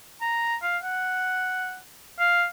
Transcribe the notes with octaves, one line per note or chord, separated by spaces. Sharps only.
A#5
F5
F#5
F5